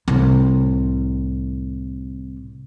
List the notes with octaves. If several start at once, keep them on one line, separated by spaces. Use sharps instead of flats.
C2 A2